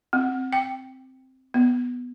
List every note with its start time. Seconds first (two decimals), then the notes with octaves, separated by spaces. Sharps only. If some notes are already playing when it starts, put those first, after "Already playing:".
0.13 C4
0.53 G5
1.54 B3